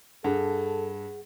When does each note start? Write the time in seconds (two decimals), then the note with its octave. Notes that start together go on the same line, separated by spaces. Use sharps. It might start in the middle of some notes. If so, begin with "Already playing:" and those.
0.24 G2 G#4 A4 F#5